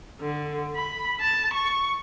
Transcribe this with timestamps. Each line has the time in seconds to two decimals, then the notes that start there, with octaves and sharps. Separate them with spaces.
0.20 D3
0.75 B5
1.21 A5
1.53 C#6